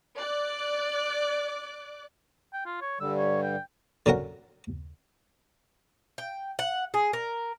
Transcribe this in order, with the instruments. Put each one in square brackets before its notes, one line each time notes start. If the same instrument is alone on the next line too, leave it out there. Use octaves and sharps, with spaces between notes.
[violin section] D5 D6 F#6
[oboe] G5
F4
C#5
[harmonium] G2 D3 G3 [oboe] E6
[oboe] C#5
G5
[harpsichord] D3 F#3 C#4 A#4 F#5
[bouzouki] G5
F#5
G#4
A#4